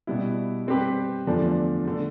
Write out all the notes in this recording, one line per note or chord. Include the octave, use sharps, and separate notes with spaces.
B2 G3 B3 E4
G3 C4 G4 B4
E2 D3 F3 A3 D4
D3 A3